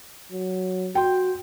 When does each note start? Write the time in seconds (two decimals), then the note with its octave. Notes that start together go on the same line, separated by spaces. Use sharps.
0.32 F#3
0.95 F#4 G5 C6